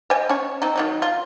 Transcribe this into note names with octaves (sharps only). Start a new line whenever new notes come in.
C5 D#5 G#5
C#4 C#5
C4 D#4
D#3 F#3 D#4
F4